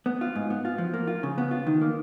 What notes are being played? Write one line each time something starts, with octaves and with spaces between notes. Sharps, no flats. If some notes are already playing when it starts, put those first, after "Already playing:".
B3
F4
G#2
B3
F4
F3
A#3
F4
C#3
B3
F4
D#3
A#3